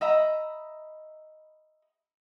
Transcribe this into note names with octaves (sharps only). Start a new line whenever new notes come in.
D#5 E5 A#5 B5